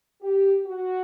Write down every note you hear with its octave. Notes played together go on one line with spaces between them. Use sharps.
G4
F#4